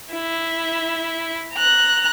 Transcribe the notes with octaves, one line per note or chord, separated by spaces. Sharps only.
E4
A#5 F#6